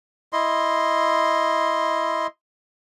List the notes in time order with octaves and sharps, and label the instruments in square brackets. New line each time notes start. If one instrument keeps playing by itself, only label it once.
[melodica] E4 D#5 C6